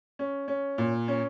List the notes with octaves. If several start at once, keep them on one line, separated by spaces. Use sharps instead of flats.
C#4
C#4
A#2
C#4